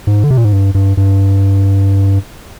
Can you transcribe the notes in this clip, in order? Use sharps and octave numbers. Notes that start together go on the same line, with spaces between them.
G#2
D3
C3
A#2
G#2
G2
G2
G2